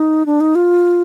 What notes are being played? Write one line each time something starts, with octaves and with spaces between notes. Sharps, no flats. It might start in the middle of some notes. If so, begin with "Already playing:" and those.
Already playing: D#4
D4
D#4
F4